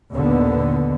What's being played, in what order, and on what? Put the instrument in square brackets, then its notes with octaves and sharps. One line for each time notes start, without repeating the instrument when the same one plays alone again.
[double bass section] A#1 D#2 B2 D3 D#3 B3